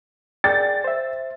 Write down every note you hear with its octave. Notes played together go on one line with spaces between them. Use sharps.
G#4 D5 G5 A6
C5 E5